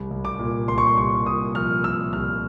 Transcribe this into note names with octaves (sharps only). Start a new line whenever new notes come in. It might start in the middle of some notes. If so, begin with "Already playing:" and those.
Already playing: C2
C2
D6
A#2
C2 C6
C#6
C6
C2 C#6
A#2 D#6
F3 F6
A#2 E6
C2 F6